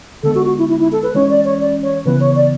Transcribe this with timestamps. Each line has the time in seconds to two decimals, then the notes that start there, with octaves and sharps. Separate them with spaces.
0.23 D3 G#3 B3 A4
0.35 F#4
0.46 F#4
0.58 E4
0.69 E4
0.80 E4
0.92 A4
1.03 B4
1.14 E3 G#3 C#4 C#5
1.30 D5
1.44 C#5
1.60 D5
1.82 C#5
2.05 C#3 E3 B3 B4
2.20 C#5
2.36 D5